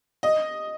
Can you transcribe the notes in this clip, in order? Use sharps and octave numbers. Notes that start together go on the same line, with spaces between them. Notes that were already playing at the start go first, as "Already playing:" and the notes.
D#5